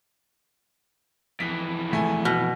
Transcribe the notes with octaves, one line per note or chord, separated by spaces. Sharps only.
F2 E3 B6
E1 A3 G#5
B2 F6